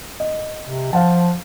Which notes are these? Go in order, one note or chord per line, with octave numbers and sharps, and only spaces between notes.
D#5
C3
F3 F5 F#5 A5